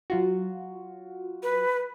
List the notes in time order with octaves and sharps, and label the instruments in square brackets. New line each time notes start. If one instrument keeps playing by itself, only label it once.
[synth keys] F#3 F4 F#4
[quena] B4